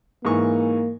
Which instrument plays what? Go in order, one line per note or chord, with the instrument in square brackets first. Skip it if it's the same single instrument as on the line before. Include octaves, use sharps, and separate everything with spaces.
[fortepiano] G#2 E3 C#6 [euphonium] A#3